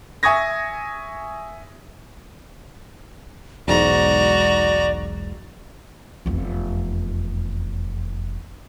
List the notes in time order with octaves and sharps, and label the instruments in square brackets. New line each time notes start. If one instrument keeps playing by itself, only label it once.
[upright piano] E5 G#5 C#6 D#6 G#6 A#6
[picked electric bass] E1 B1 G#2 [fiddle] F#4 A#5 [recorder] D5
[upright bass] F1 E2